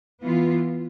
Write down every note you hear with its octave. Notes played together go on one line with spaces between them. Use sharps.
E3 B3 F4